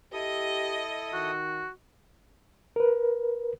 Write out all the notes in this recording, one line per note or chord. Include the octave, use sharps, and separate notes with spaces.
E4 G4 A4 D#5 D#6
D#3 F#4
A#4 B4